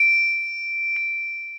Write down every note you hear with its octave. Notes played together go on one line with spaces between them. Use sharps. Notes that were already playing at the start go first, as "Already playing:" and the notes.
Already playing: D7
D7